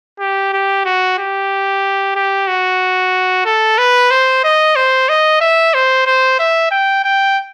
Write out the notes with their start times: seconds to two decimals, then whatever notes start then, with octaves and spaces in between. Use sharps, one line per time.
0.20 G4
0.54 G4
0.85 F#4
1.19 G4
2.16 G4
2.48 F#4
3.46 A4
3.78 B4
4.11 C5
4.44 D#5
4.76 C5
5.09 D#5
5.41 E5
5.74 C5
6.07 C5
6.39 E5
6.71 G5
7.04 G5